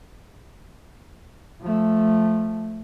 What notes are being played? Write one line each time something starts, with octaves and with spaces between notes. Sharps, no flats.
F3 A3